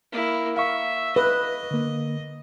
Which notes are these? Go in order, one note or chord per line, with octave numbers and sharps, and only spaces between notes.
A#3 E4
E5 F5 C#6
B4 D#5
D3 A#3